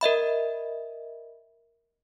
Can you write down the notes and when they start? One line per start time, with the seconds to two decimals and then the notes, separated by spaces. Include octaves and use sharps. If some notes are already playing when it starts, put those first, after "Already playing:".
0.01 A#4 D#5 E5 B5